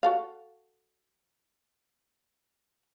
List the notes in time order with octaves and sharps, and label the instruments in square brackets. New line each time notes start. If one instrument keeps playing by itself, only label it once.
[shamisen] F#4 A4 F5